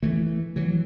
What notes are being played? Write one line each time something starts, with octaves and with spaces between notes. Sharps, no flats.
E3 A3
E3 F#3